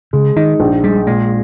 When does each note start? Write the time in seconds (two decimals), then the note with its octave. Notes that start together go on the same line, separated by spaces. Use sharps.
0.13 C#3 G#3
0.36 D#3 D#4
0.60 A#1
0.84 G3 G#3
1.07 A#2 G#3